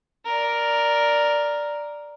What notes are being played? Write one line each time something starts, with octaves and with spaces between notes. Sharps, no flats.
A#4 D5